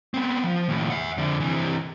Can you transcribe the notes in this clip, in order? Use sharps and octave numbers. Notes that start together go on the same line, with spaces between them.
B3 C4
F3
D#2 A2
E5 F#5
F2 D3
C3 E3